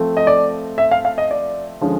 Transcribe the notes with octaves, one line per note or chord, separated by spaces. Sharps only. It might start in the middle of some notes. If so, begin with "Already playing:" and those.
Already playing: F3 A3 C4
D#5
D5
E5
F5
F5
D#5
D5
D3 F3 G#3 C#4